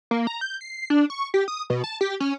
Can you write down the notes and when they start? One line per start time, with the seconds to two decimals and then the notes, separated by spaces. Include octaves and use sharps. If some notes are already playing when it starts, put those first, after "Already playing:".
0.11 A#3
0.27 A#5
0.41 G6
0.61 C7
0.90 D4
1.10 C#6
1.34 G4
1.48 D#6
1.70 B2
1.84 A5
2.01 G4
2.20 C#4